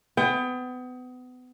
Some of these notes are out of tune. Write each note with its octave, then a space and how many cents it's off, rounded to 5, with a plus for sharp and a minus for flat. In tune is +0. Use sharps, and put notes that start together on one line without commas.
B3 +30 G5 +30